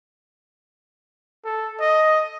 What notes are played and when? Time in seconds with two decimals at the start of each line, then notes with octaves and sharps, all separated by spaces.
1.45 A4
1.80 D#5